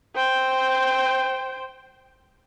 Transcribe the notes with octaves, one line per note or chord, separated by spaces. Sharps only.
C5 G5